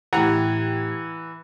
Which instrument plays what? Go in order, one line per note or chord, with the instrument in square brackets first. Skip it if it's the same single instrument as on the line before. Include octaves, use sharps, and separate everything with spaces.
[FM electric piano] A2 G4 G#6 [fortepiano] E3 F#5 A#5